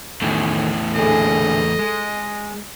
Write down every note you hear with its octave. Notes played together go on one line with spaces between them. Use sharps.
E2 A2 D#3 A3
A#2 D3 G#4 A4 D#5
G#3